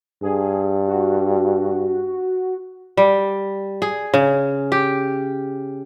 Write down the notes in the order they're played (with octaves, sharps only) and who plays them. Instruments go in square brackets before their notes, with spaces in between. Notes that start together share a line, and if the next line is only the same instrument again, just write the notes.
[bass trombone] G2 [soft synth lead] G#4
[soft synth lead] F#4
[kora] G3
G#4
C#3
G4